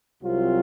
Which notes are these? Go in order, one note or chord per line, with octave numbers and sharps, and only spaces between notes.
C2 C3 F#3 C4 F4